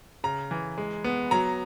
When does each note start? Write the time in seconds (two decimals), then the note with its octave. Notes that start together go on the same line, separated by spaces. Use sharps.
0.24 C#3 A#5
0.51 E3
0.78 G#3
1.04 B3
1.31 F#3 A#5